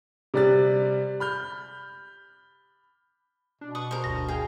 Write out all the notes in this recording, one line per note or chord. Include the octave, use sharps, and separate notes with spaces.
C3 G3 D5 F#6 A6
B5 F6 G6
B2 D4
B4 C#6 D#6
A#4 C5
G1 D2 A#6
G#4 F5 G5